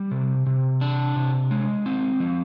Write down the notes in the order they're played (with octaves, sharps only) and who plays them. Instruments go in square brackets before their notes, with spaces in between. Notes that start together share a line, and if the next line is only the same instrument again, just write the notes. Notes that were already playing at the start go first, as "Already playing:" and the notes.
Already playing: [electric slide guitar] G3
C3
C3
D4
C3
G#3
C4
F3